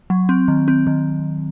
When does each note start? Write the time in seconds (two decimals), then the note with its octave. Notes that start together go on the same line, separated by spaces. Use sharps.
0.10 F#3
0.29 C4
0.48 D#3
0.68 C4
0.87 D#3